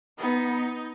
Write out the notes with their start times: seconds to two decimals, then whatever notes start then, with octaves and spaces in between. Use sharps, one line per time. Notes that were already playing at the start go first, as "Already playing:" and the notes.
0.19 B3 D#4